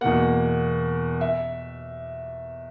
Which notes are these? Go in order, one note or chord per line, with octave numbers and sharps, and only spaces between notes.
E2 B2 A#3 F#5
E5